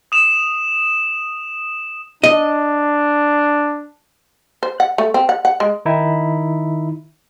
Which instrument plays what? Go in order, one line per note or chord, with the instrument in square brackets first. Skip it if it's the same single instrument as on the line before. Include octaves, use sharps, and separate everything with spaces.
[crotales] D#6 E7 F7
[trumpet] D4 [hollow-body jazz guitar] D#5
[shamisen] C5
F#5
A3
C4
F#5
F#5
G#3
[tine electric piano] D#3 D#4 E4